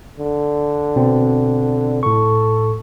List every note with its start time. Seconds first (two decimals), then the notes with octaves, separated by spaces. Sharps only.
0.20 D3
0.96 B2 C4
2.03 A2 A4 C#6